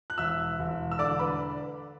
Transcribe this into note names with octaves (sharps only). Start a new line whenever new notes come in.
F#6
E1 E5 E6
E1
E6
D3 D5 D6
B4 B5